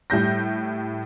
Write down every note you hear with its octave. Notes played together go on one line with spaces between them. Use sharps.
A2 G3 G6 A#6